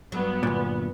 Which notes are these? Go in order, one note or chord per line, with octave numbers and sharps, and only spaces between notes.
G2 F#3 B3
D2 A#2